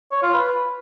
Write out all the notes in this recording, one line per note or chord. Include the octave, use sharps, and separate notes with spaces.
C#5
F4
B4